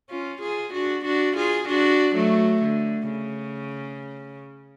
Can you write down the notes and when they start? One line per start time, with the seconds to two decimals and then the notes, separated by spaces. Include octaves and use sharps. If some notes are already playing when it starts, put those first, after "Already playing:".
0.10 C#4 F4
0.42 F4 G#4
0.73 D4 F#4
1.05 D4 F#4
1.37 F4 G#4
1.68 D4 F#4
2.16 F#3 A3
2.63 D3
3.11 C#3